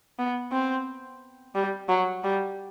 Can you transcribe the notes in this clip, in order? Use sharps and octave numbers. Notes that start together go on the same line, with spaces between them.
B3
C4
G3
F#3
G3